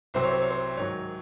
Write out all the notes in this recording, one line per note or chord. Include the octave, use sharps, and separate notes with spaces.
C2 C3 F#3 C4 C5
C#5
C5
C#5
C5
G#2 D#3 F#3 C#5